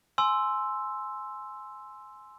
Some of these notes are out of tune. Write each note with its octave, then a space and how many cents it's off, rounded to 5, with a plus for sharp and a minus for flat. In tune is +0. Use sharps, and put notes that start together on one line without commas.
G#5 +20 C6 +0 E6 +0